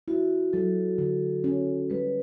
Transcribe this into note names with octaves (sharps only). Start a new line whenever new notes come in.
E4 F#4
F#3 A4
D3
C#4
G3 B4